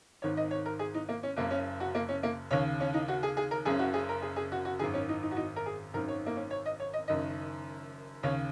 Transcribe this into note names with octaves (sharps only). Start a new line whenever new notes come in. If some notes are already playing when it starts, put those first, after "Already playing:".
G#1 G#2 D#3 C#5
D#5
C#5
A#4
G#4
D#4
A#3
C#4
F#1 F#2 C#3 A#3
C#4
F#4
A#3
C#4
A#3
D#2 C#3 C#5
C#4
D#4
F#4
G#4
G#4
A#4
F#1 F#2 C#3 G#4
F#4
G#4
A#4
G#4
G#4
F#4
F#4
G#1 F#2 D#3 G#4
C#4
D#4
D#4
F#4
D#4
A#4
G#4
G#1 F#2 D#3 A#4
C#5
A#3
C#4
C#5
D#5
C#5
D#5
F#1 F#2 D#3 D#5
D#2 C#3 C#5